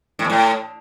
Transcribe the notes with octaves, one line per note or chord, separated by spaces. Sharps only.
A2
E2
A2